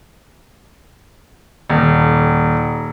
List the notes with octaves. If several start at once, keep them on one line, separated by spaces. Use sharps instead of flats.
D#1